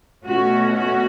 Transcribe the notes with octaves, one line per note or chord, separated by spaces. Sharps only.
B2 A3 C#4 F#4
F#4